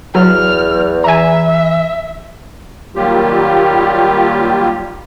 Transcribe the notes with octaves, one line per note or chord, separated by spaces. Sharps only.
E2 F#3 F6
E3 E5 G#5 A#5
D#3 F#3 G3 A#3 F4 G4